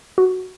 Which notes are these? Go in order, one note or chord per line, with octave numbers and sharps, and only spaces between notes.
F#4